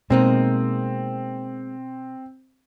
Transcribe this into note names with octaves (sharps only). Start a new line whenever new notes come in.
B2 G#3 A#3 C4 D#4